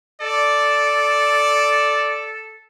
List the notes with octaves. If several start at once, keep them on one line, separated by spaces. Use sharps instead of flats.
A4 D5